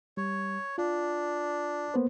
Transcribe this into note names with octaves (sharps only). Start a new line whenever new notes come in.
G3 C#5
D4 F4
A#3 B3 C5